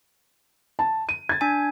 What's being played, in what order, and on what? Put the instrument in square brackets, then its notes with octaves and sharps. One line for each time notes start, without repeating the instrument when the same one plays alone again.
[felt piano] A5
D#7
G#6 A6
[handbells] D4 G#5